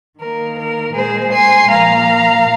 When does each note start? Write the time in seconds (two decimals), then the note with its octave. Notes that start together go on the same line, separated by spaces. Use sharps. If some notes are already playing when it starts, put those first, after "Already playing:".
0.20 D#3 A#3 A#4
0.57 A#4
0.95 A#2 G#3 G#4 C5
1.32 G#5 C6
1.70 A#2 F3 A#3 F5 A#5